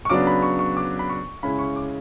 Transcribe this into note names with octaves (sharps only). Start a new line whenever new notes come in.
C#6
C#3 F#3 B3 D4 D6
B5
C#6
C#6
D6
B5
C#6
C#3 G#3 C#4 E4 B5
C#6
D6